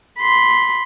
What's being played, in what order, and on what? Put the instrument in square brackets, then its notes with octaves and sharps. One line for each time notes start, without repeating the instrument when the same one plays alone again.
[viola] B5 C6